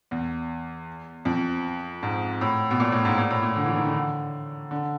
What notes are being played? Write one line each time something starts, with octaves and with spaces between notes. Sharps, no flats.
E2
F2
G#2
A2
B2
A#2
A2
G#2
A#2
A2
A#2
D3
E3
D#3
D3
D3